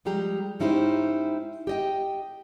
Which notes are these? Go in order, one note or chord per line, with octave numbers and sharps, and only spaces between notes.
F3 G3 G#3 G4 A#5
G#2 C#4 D#4 E4 G4 C5
G4 D#5 G5